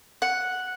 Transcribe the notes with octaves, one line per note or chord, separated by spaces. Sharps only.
F#5